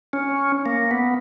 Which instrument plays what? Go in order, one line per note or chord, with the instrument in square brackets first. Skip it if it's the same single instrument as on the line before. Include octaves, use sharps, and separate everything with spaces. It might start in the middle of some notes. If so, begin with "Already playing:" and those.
[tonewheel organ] C#4
A#3
B3